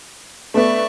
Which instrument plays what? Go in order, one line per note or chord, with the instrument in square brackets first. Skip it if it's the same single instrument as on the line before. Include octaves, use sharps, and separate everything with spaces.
[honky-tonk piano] A3 B3 [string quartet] D5 E5 C#6